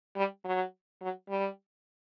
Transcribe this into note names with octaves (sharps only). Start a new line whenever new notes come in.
G3
F#3
F#3
G3